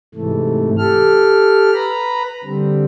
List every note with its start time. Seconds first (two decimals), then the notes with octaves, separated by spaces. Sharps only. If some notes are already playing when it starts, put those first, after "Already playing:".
0.15 G#2 C3 E3 A3
0.78 G4 A4 F6
1.74 B4 A#5 B5
2.44 D3 G3 C4